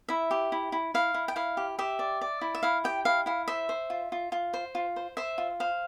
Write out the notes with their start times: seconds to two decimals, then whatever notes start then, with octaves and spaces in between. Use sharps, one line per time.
0.08 E4 E5
0.31 G4
0.52 E4
0.72 E4
0.94 E4 F5
1.14 E4
1.28 G5
1.36 E4 F5
1.57 G4
1.79 G4 E5
1.99 D5
2.21 D5
2.41 E4
2.55 E5
2.63 E4 F5
2.84 G4 G5
3.05 E4 F5
3.26 E4 F5
3.48 C5 E5
3.69 C5
3.90 F4
4.12 F4
4.32 F4
4.54 C5
4.75 F4
4.96 C5
5.17 C5 E5
5.38 F4
5.60 C5 F5